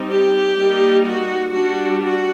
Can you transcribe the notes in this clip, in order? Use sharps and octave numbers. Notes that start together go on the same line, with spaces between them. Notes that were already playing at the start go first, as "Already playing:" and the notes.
Already playing: G3 C4 D#4
G4
G3 A#3 D#4
F#4
G3 D4 F#4
F#4